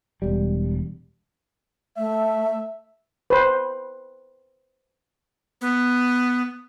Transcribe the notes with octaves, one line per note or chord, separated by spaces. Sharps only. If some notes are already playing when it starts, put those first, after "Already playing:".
E1 G3
A3 E5
B4 C5
B3